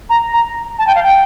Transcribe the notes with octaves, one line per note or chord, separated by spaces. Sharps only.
A#5
A#5
A5
G5
F5
G5